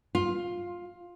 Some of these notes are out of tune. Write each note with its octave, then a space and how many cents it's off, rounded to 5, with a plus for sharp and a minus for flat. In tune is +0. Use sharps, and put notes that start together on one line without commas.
F4 +10